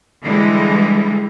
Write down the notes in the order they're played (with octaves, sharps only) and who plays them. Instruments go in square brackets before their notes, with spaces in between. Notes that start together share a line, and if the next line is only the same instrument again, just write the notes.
[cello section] D3 E3 G3 G#3